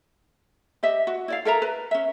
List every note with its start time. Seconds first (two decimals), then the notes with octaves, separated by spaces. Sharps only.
0.83 G4 D#5 E5
1.07 F#4
1.28 E4 D5 F5
1.45 A4 A#4 E5 A#5
1.62 B4
1.91 C#4 E5